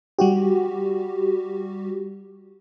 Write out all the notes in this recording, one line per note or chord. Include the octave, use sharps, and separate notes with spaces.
G3 F#4 G4